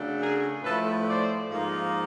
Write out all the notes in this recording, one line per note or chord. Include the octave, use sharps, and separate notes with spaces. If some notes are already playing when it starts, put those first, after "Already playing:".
Already playing: C#3 F#3 A3 D4
G#4 A#4
A2 F3 A3 A4 B4
C5 D5
G#2 F3 A#3 D#4